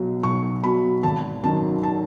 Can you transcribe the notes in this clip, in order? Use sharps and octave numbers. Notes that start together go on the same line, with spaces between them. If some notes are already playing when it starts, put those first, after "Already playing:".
Already playing: B1 B2 F#3
B1 C#6
B2 F#3 B5
G#1 A5
F#2 D#3 F#3 A5
A5